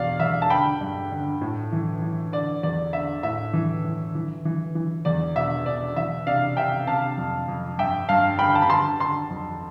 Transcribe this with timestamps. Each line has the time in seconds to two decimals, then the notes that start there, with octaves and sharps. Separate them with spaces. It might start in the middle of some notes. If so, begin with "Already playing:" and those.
Already playing: E2 B2 D5 F5
0.20 E2 E5
0.42 A5
0.50 D3 G5 B5
0.81 G2
1.12 D3
1.41 A2
1.72 E3
2.02 E3
2.32 D3 D5
2.63 E2 D5
2.93 D3 E5
3.23 A2 E5
3.53 E3
3.84 E3
4.15 E3
4.45 E3
4.75 E3
5.05 E2 D5
5.36 B2 E5
5.66 B2 D5
5.96 E3 E5
6.27 C3 D5 F5
6.57 C3 E5 G5
6.87 C3 F5 A5
7.18 F2
7.48 F2
7.78 G2 E5 G5
8.09 G2 F5 A5
8.39 D3 G5 B5
8.55 A5
8.62 B5
8.69 D3 A5 C6
9.00 D3 A5 C6
9.30 F2